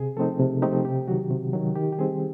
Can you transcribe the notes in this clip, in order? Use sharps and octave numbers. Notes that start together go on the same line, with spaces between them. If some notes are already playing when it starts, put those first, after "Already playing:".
Already playing: C3 G#4
F3 A3 C4 D#4 A4
C3
F3 A3 C4 D#4 G4
C3 G4
D#3 F#3 F#4
C3
D#3 F#3
D#3 G4
G4
G3 C4 D#4 G#4